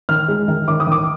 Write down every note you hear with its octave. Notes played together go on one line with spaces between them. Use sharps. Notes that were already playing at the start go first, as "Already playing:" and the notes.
D#3 F6
G#3
D#3
D#3 D6
D#6
D#3 D6